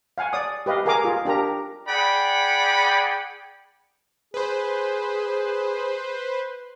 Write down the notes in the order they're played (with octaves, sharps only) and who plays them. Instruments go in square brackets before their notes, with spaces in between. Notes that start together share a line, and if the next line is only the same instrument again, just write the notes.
[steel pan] F5 F#5 G#5
D5 D#6
G4 B4 D#5 F5
G#4 A#4 F5 G#5 A#5 D6
F4 G#4
D4 G4 A#4 A#5
[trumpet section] G#4 D5 F#5 G5 B5
[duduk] G#4 [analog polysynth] B4 C5